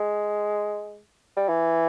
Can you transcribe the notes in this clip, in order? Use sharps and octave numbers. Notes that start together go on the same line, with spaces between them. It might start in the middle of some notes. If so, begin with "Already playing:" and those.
Already playing: G#3
G3
E3